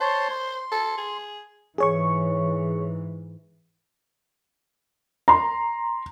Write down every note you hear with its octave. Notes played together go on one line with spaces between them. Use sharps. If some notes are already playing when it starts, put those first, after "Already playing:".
C5 C#5 A5 C6
C6
A4
G#4
G#2 E3 G#4 C#5 C#6
A#5 C6